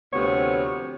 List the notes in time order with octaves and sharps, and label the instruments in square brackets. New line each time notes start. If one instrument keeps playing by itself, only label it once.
[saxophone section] D2 C3 F3 B3 C#5